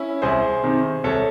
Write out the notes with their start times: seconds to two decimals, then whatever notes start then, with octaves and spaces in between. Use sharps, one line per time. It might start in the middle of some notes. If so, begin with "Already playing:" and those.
Already playing: C#4 E4
0.22 C2 G#4 C5
0.63 C3 D#3
1.04 C2 A4 C#5